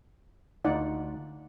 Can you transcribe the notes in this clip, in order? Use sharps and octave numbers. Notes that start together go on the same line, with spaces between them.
D2 D#4 F4 D5 F#5